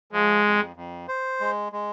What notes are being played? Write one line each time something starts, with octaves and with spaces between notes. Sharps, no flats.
F3 G#3
F2
F2
C5
G#3
G#3